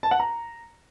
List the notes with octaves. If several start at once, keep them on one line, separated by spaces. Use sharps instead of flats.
A5
F#5
A#5